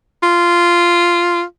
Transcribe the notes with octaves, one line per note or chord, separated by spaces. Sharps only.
F4